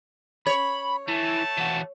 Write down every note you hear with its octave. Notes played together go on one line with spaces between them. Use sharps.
C#5 B5
E3 A3 A5
E3 F#4